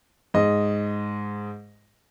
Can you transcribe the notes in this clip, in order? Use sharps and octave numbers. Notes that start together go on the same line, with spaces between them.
G#2 D#5